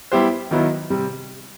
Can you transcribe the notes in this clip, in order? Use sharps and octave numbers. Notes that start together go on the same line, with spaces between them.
G3 B3 E4 G4 C5
D#3 F#3 B3 E4
C3 G3